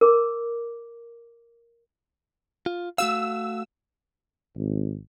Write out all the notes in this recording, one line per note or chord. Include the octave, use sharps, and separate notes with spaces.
A#4 D6
F4
A3 F#4 F5 E6
G#1